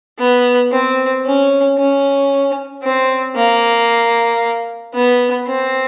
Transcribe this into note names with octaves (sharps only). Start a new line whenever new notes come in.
B3
C4
C#4
C#4
C4
A#3
B3
C4